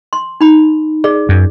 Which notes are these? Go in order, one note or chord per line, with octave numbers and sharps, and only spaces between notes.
C6
D#4 B5
G#4 D5
F#2